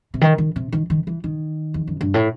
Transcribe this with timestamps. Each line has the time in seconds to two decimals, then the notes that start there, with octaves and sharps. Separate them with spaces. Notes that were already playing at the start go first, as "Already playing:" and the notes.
0.14 C3
0.21 D#3
0.38 D#3
0.56 C3
0.72 D#3
0.90 D#3
1.07 E3
1.24 D#3
1.74 E2
1.87 F#2
2.01 G2
2.14 A2